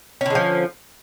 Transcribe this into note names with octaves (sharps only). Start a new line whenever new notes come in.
D3 F3 G#3 C#4